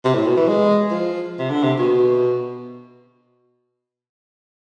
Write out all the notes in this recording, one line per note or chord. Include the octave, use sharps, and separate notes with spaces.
C3
A2
B2
E3
G#3
F3
C3
D3
C3
B2